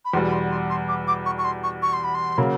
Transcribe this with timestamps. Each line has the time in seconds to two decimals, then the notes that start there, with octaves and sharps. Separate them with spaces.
0.04 B5
0.13 E2 B2 G3 C6
0.27 B5
0.32 C6
0.51 C6
0.69 C6
0.88 D6
1.07 D6
1.25 C#6
1.38 C#6
1.44 C6
1.63 C#6
1.82 C#6
1.93 C6
2.04 B5
2.14 C6
2.38 C#3 F#3 A#3